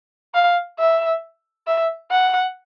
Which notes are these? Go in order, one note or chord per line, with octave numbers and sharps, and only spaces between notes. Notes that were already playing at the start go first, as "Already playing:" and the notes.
F5
E5
E5
F#5